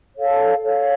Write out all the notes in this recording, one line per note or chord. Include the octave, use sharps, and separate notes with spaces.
A4 C#5 F5
A4 C#5 F5